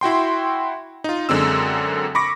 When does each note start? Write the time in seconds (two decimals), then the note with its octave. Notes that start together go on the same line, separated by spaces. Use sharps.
0.01 E4 F#4 G5 C6
1.04 D#4 F4
1.29 F#2 D3 G#3 C4 E6
2.15 B5 C#6 D6 A#6